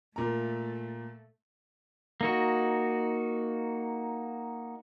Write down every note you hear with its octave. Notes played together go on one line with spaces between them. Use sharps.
A#2 A3 A#5
A#3 D#4 F#4